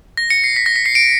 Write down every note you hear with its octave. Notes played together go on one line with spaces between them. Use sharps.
A#6
C#7
C7
B6
A#6
B6
C7
D7